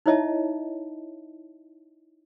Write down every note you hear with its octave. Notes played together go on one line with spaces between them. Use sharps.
D#4 E4 C#5 D#5 E5 A5